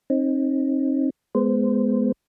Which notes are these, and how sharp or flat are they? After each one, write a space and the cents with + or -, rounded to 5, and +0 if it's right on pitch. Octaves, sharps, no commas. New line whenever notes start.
C4 +35 D#4 +0
G#3 +15 B3 +0 C5 -20